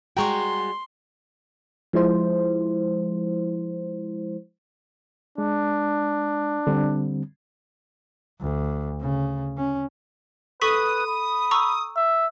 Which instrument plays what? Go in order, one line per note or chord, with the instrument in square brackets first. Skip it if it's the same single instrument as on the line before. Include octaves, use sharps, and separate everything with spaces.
[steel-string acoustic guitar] G3 G#3 F#4 [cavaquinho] G5 A#5 C#6 [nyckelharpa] C6
[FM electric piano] F3 G#3 E4 C5
[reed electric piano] G#3 [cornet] D4
[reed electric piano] D3 G3 C4
[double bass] D2
C#3
C#4
[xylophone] A4 C#6 B6 [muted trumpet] B4 [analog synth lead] D#6
[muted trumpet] B5
[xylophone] A#5 C#6 E6
[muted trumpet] E5